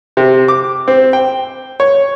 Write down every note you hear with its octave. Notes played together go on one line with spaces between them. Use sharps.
C3
D6
C4
G5
C#5